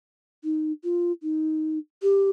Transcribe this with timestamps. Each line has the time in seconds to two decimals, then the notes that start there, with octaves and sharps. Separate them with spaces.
0.44 D#4
0.84 F4
1.23 D#4
2.02 G4